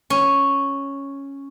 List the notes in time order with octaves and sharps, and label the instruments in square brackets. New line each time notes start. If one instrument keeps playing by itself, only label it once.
[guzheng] C#4